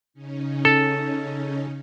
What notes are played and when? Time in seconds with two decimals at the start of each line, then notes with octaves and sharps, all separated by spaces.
0.14 C#3 C#4 D#4
0.65 A4